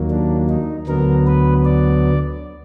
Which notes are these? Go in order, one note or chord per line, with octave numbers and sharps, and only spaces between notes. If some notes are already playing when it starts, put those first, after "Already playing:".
Already playing: D#2 D#3 F#3 A#3
D4
D#4
D2 D3 F#3 B3 A#4
B4
D5